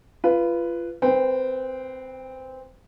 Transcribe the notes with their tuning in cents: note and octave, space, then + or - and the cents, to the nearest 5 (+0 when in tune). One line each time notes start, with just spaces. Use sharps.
F4 -25 B4 +0
C4 -15 B4 +0 G5 +25